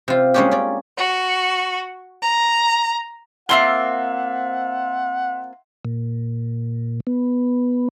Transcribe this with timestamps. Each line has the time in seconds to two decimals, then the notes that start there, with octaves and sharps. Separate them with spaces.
0.08 C3 F4
0.34 G3 G#3 A#3 C#4 D4 G4
0.51 C#4 D5
0.96 F#4
2.21 A#5
3.49 A#3 C4 F4 E5 F#5 C6 G7
5.85 A#2
7.07 B3